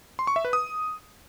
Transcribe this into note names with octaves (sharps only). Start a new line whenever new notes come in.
C6
C#6
E5
B4
D#6